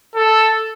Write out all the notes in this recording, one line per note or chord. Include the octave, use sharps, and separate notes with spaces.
A4